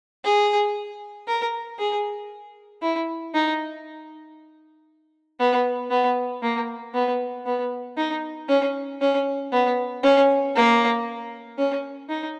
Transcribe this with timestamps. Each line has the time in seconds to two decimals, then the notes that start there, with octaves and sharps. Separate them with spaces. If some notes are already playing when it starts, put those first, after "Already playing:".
0.24 G#4
1.28 A#4
1.79 G#4
2.82 E4
3.34 D#4
5.40 B3
5.91 B3
6.42 A#3
6.94 B3
7.46 B3
7.97 D#4
8.48 C#4
9.01 C#4
9.52 B3
10.03 C#4
10.56 A#3
11.58 C#4
12.09 D#4